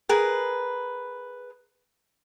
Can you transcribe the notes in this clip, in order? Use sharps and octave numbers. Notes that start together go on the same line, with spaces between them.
G#4 A#4 B4